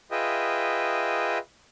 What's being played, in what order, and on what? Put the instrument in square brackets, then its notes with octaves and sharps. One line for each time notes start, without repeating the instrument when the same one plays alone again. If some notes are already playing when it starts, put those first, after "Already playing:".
[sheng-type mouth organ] F4 G#4 B4 D#5 E5 G5